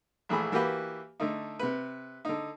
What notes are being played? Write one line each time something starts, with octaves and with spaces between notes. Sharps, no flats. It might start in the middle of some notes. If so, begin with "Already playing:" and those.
A#1 E3 A3 G#4 B5
E3 A#3 F#4 G4 B4
D3 A3 D#4
C3 B4
D3 D#4